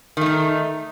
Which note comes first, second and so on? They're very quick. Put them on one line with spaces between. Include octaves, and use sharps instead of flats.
D#3 A3 D#4